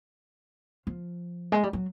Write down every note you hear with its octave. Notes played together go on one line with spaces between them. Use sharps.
F3
G#3
G3
F#3